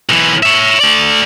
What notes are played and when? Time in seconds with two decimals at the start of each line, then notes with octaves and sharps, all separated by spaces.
0.09 B1 E3
0.43 C#5 E5
0.80 A3 D5